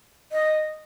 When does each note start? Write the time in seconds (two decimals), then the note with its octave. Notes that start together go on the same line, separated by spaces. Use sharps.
0.32 D#5